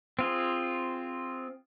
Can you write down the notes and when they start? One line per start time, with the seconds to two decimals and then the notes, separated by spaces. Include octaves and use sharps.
0.19 C4 F4 G#4